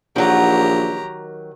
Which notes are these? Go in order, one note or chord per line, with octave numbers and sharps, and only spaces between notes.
A#1 D#3 F#3 G4 A#5